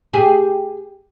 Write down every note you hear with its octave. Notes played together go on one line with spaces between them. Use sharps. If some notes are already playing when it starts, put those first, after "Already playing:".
G4 G#4